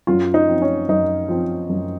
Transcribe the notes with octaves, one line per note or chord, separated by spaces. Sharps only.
F#2 F4
D#4
F3 C4
C#4
F#2 D#4
F3 C4
F#2